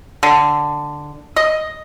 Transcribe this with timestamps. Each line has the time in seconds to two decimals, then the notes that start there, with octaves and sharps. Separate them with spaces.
0.23 D3
1.36 D#5